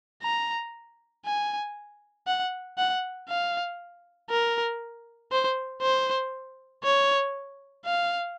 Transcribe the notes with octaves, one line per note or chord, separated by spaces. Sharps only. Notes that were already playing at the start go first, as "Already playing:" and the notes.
A#5
G#5
F#5
F#5
F5
A#4
C5
C5
C#5
F5